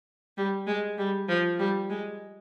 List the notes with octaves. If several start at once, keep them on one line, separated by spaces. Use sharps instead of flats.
G3
G#3
G3
F3
G3
G#3